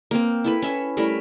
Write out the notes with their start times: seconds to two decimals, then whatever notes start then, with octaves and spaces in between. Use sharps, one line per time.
0.11 A#3 C4
0.44 E4 A4 B4
0.62 C#4 E5 C#6
0.97 G3 A3 E4 A#4